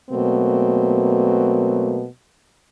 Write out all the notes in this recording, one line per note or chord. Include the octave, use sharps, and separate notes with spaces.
B2 F#3 A3 A#3 C4